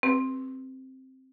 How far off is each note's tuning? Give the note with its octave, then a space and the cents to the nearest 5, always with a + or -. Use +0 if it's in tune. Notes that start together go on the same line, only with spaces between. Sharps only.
C4 +5 G4 +30 B4 +0